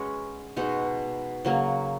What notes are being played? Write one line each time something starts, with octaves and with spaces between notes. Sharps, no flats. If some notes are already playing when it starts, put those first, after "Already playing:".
Already playing: G#3 C#4 F#4 B4
B2 G#3 D#4 F#4
C#3 F#3 A#3